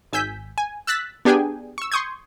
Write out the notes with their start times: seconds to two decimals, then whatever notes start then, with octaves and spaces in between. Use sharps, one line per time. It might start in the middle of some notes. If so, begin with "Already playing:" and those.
0.13 G#1 G#5 E6 G6 B6
0.58 G#5
0.87 E6 F#6 A6 B6
1.25 B3 D4 G4 G#4 G5 G#5
1.78 C#6 E6
1.92 C6 C#6 D#6 G6 G#6